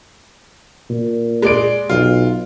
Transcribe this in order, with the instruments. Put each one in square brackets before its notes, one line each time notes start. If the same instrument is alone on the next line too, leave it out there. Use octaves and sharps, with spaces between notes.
[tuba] A#2
[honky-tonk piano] G#3 D5 D7
[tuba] B1 [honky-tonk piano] F4